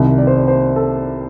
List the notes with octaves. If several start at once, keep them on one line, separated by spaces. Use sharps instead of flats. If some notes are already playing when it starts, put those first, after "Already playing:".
Already playing: C2 C3 D#3
D5
C5
D5
C5
A4